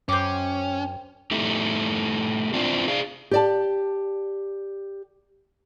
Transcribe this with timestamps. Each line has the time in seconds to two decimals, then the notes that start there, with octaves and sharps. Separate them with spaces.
0.09 F#2 C#4 C5 G5 D6
1.31 A3 D#4 E4 G4 A4
2.54 C4 D4 E4 F4 C5
2.88 G#4 D5 F5
3.31 G4 D5 A5